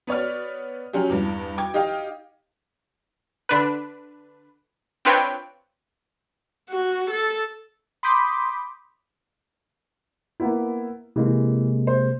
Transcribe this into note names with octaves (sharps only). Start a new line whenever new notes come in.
B3 B4 C#5 D5 F6
F#3 C#4 F4 G4
E2 G2
G5 D6 G#6
D#4 G4 D#5 F5 G5
D3 D4 B4
C4 D4 F4 B4 C#5 G5
F#4
A4
B5 C6 D6 D#6 G6 B6
A#3 B3 E4
C3 E3 G#3 A#3
C5